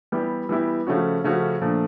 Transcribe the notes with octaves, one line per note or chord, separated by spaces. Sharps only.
E3 G3 B3 E4 G4
E3 G3 B3 E4 G4
C#3 F3 A3 C#4 F#4
C#3 F3 A3 C#4 F#4
A#2 F3 A3 D4